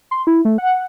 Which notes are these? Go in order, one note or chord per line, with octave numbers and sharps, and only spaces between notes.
C6
E4
A3
F#5